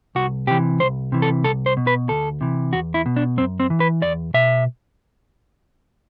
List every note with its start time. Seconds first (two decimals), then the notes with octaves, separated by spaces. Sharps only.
0.15 C2 F#4
0.47 C3 E3 G4
0.80 C2 C5
1.12 C3 E3
1.22 A4
1.44 C2 A4
1.66 C5
1.77 B2
1.87 B4
2.09 D2 A4
2.41 C3 E3
2.73 E2 F#4
2.94 E4
3.06 B2
3.16 D4
3.37 F#2 C4
3.60 C4
3.70 E3
3.80 B4
4.02 E2 D5
4.34 B2 E5